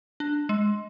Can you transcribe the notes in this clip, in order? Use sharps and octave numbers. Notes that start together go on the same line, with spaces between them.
D4
G#3